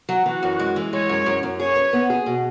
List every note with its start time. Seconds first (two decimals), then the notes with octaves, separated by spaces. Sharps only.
0.09 F#3
0.26 E3 F#4
0.43 F#2
0.60 G#3
0.76 E3
0.93 G#3 C#5
1.09 F#2
1.26 F#2
1.43 F#2
1.59 G#4 C#5
1.76 B4
1.93 B3
2.10 G#4
2.26 B2